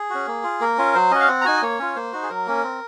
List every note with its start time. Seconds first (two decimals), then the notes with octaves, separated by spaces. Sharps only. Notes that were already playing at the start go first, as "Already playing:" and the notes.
Already playing: G#4
0.10 C#4 F#4
0.27 A#3
0.44 F4
0.61 A#3 A#4
0.78 C#4 F4
0.95 F#3 C5
1.11 C#4 F#4 D#5
1.20 F5
1.28 C4 F#5
1.41 A#5
1.45 D#4 F#4 G#5
1.57 D#5
1.62 A#3 C#5
1.79 C#4 F4
1.96 A#3 C5
2.13 D#4 F#4
2.23 G#4
2.29 F#3 A#4
2.47 A#3 C#4
2.63 C4